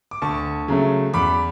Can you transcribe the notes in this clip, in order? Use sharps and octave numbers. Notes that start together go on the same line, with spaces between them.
D6
D2 A5 C#6
C#3 F#3 A3
E2 B5 D6